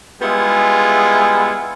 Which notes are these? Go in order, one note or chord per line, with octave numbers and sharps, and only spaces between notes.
G3 G#3 B3 E4 F4 G#4